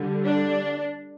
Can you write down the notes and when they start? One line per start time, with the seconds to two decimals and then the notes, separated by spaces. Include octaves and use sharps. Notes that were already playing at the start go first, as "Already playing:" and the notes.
Already playing: D3 G3
0.25 D4